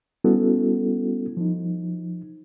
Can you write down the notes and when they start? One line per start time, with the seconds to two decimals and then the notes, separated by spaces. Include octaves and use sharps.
0.24 G3 B3 C#4 E4 F#4 A4
1.37 F3 D#4